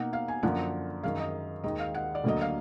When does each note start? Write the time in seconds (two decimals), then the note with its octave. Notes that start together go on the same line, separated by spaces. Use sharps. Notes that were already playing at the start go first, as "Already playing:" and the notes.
Already playing: B2 A#3 D#4 F#5
0.13 F5
0.28 G#5
0.43 F#2 D3 F3 A#3 D4 F#5
1.03 F#2 D#3 G#3 F5
1.19 D#5
1.64 D#2 D#3 G#3 D#5
1.79 F5
1.95 F#5
2.15 D5
2.24 D2 D3 F#3 A#3 D#5
2.41 F5